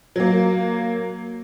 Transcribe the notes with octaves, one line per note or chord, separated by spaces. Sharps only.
F#3 A#3